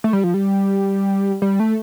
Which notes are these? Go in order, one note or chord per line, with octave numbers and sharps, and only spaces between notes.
A3
G3
F3
G3
G3
A3